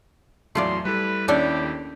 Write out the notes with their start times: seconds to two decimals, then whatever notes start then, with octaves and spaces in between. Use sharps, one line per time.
0.55 E2 A2 F#3 A3 F4 D5 C6
0.85 G3 E4 A4 B4
1.28 D#2 C#4 D4 E4 G4 A4